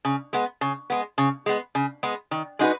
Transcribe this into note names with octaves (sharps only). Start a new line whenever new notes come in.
C#3
G#3 B3
C#3
G#3 B3
C#3
G#3 B3
C#3
G#3 B3
D#3
G#3 D#4 F#4 B4